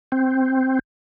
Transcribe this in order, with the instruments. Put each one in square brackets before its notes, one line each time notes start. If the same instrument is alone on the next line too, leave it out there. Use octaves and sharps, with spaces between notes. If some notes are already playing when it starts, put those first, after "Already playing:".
[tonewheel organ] C4